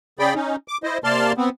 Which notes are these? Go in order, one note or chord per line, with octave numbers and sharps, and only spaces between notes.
C#3 G#4 D5 G5 B5
C#4 D#4
D6
E4 C5 D#5
C3 A#3 D5 A5 C6 F6
B3 C4